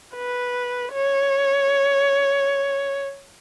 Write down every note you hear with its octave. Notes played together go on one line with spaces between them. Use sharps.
B4
C#5